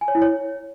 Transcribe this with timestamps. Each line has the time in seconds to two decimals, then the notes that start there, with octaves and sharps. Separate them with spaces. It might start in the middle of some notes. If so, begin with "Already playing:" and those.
0.01 G#5
0.08 C#5
0.15 E4
0.22 C#5